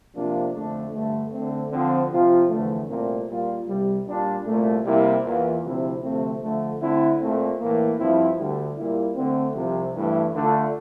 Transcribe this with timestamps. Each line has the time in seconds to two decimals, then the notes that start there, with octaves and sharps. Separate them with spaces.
0.15 C3 F3 A#3 D4 F4
0.54 F2 D3 A3 D4
0.93 G2 D3 A3
1.32 D3 A3 C4
1.71 D3 F3 C4
2.11 C3 F3 C4 F4
2.50 E2 D3 F3 A3
2.89 C2 A#2 A3 C4
3.29 A#2 G3 A#3 F4
3.68 C2 C3 G3
4.07 A#2 G3 D4 F4
4.46 C2 A#2 A3
4.85 C3 G3 A#3 E4
5.25 E2 E3 A#3 F4
5.63 D2 C3 F3 C4 E4
6.03 D2 C3 F3 A3 C4
6.43 D3 F3 A3
6.81 D3 A3 C4 E4
7.20 A#2 A3 C4
7.60 A2 E3 A#3
7.99 G2 F3 C4 E4
8.37 D2 D3 G3
8.78 A#2 G3 A#3 E4
9.16 D3 A3 C4
9.56 C2 C3 F3
9.95 G2 E3 A3 E4
10.34 D3 A3 D4 F4